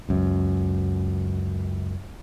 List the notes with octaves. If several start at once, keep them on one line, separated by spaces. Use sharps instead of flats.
C#2 F#2